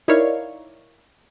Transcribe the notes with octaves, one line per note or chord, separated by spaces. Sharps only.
D#4 E4 A#4 C#5 D5 F5